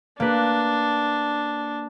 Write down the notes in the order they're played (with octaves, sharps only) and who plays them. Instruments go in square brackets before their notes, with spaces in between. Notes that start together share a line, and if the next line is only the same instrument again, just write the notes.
[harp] A#3 B4 [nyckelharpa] D4